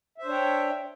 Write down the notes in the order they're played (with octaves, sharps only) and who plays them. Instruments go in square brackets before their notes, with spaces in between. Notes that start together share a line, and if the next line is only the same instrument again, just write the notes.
[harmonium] E5
C5
D4
C#5
G5